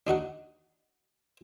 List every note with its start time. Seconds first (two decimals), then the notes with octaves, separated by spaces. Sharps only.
0.07 D4 D#4 F#4 F#5